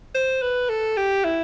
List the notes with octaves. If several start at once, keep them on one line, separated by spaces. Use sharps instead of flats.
C5
B4
A4
G4
E4